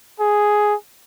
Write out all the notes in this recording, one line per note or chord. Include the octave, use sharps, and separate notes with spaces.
G#4